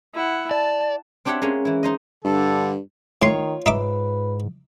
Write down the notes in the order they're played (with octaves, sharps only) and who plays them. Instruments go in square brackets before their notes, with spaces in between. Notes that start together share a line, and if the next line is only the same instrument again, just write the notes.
[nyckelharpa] E4 F#5
[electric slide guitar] D5 [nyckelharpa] A5
[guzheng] C4 D4 G4 C#5 E5 F#5
G#3 A#3 C#4
E3 E4
D#4 C5 D#5
[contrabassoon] G2 [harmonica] D3 A4
[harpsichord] A2 C6 [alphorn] D#3 [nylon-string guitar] F4 C#5
[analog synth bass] G#2 [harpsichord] D#4 E5 D6 [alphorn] B4